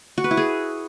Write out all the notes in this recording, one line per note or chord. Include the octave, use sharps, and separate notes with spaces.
F#4
B4
E4
G#4